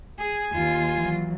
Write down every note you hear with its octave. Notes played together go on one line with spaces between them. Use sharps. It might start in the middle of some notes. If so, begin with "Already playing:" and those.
G#4 G#5
D#2 F4
E3 F#3